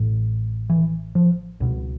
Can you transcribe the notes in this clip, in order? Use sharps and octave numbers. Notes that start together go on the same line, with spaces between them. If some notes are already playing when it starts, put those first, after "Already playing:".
Already playing: A1 A2
E3
F3
C#2 B2